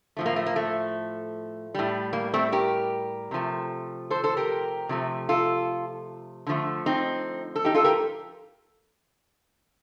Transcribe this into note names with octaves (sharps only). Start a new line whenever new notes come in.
A2 F3 A3
A#3
A3
A#3
A3
A2 G3
A#3
A3 C4
G4 A#4
C3 F3 A3
A4 C5
A4 C5
G4 A#4
C3 F3 A3
F4 A4
D3 F3 A3
C4 D#4
A4
D#4 G4
F4 A4
G4 A#4